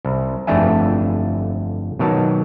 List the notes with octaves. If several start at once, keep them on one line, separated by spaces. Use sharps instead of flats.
C2
G1 F2 A3 D4 E5 G#5
B2 D#3 F#3 A5